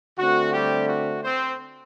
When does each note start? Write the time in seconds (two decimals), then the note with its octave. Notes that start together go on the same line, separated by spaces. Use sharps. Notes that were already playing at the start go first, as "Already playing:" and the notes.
0.18 D3 A3 C4 F#4
0.54 G3 G4
0.89 F#4
1.24 C4 C5